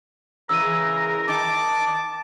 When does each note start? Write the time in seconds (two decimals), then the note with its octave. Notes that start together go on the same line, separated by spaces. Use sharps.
0.49 C#3 E3 G#3 A#4 E6 D#7
1.28 D#3 D#4 A5 D6